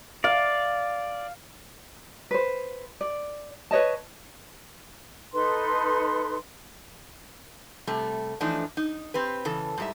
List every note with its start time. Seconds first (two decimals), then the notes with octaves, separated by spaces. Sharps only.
0.24 D5 F5
2.31 B4 C5
3.01 D5
3.71 B4 C#5 D#5 A5
5.33 D#4 A4 B4 C6
7.87 C3 G3 A3
8.40 E3 F3 A3 D4 D#4
8.77 D#4
9.14 C4 G4 B4
9.45 C#3 E3 A4
9.78 G#2 G3 E5